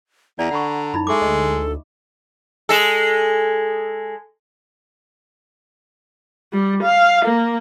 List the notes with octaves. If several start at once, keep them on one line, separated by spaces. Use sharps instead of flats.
E2 D5 A#5
D3 F#5 B5 C#6
F#2 D#4 E4 B5
G#3 A4 E5 C#6 D6
D2 D#5
G#3 A4
G3
F5
A#3